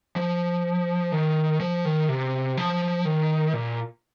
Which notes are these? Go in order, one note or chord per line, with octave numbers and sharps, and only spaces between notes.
F3
D#3
F3
D#3
C3
F3
D#3
A#2